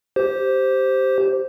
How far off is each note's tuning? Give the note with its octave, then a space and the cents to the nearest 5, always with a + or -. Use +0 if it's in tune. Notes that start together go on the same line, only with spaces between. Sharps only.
G4 -10 C5 +0